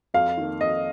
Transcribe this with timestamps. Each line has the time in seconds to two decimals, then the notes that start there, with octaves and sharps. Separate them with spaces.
0.14 F2 F5
0.38 D#3 A#3
0.60 F2 D#5